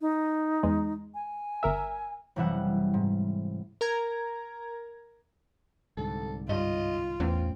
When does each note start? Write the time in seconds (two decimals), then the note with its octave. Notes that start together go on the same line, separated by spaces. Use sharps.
0.01 D#4
0.63 E2 G#3
1.14 G#5
1.63 G1 A#4 E5
2.36 F#1 C3 E3 G3 E5 F#5
2.94 G#2
3.81 A#4 A#5 G#6
5.97 C2 G#2 D3 A4
6.49 G2 F4 D#5
7.20 A1 E2 A3 C4 C#4